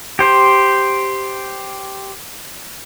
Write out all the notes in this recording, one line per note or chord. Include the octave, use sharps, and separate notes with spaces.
G4 C5